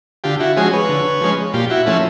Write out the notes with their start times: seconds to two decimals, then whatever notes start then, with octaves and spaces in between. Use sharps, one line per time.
0.24 D3 F4 G4
0.40 E4 F#4
0.56 F3 G#3 C#4 F#4 G#4
0.73 B4 C#5
0.89 D3
1.21 F3 G#3 C#4
1.53 A#2 F4 G4
1.70 E4 F#4
1.86 F3 A3 C#4 E4